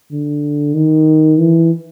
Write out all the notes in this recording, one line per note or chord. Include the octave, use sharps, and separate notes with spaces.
D3
D#3
E3